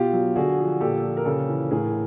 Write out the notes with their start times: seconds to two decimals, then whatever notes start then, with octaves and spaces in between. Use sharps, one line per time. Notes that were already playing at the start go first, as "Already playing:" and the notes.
Already playing: B2 F4 G4
0.13 F#3
0.36 D3 F#4 G#4
0.58 F3
0.81 A#2 G4 A4
1.03 F3
1.17 A#4
1.25 C#3 G4 A4
1.49 E3
1.71 A2 G#4 A#4